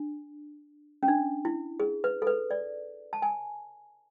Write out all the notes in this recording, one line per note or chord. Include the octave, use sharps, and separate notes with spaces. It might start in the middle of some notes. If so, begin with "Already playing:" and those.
Already playing: D4
C#4
D4
E4
G#4
B4
A4
B4
D5
A5
G#5